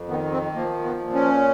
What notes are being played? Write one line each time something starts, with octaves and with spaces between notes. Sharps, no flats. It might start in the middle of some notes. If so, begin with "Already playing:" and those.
Already playing: F2
D#3 B3
C4
F3 A#3
B3
A#2
C#4